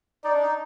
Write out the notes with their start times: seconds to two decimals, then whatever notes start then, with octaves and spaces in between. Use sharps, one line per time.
0.24 D#4 D5
0.34 D4
0.42 D#4